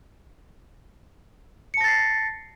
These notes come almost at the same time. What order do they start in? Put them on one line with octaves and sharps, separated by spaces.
C#7 A5 A#6 A6 C7